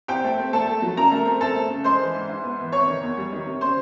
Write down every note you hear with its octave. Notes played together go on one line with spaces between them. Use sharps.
C4 G4 G5
A3
C4
A3 A4 A5
A3
F#3
C#3 A#4 A#5
A3
C4
C4 A4 A5
A3
C#3
G#3 C5 C6
E3
G#2
G#2
B3
E3
C3 C#5 C#6
D#3
E2
G3
D#3
C3
C#3 C5 C6